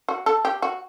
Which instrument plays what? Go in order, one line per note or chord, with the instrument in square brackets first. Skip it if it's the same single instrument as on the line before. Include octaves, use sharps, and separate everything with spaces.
[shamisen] F#4
A4
G4
F#4